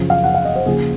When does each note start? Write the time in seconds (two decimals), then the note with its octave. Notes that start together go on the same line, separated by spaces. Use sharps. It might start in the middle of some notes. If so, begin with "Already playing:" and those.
Already playing: F#2 C#3 F3
0.10 F5
0.24 F#5
0.34 F5
0.45 D#5
0.56 C5
0.66 D#2 C#3 F3 G#4